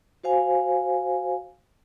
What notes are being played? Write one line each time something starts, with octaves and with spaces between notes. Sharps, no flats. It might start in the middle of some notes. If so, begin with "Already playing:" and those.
F#4 C5 F5 G#5